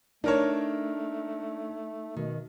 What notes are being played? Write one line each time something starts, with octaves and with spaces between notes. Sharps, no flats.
A3 D4 D#4 A#4 C#5 A5
B2 D#3